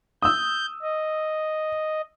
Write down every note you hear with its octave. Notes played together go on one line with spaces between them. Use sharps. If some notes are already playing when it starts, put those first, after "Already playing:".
D#6 E6 G6
D#5